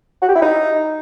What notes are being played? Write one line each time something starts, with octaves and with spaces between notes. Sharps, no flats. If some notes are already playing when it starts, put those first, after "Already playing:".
F#4
G4
E4
D#4